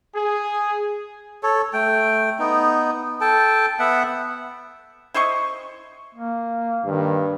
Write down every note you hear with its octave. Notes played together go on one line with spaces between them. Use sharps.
G#4
A4 C#5
A3 G5
B3 D#4
A4 G5 A5
B3 E5 F#5
E4 C5 D#5 C#6
A#3
G2 D#3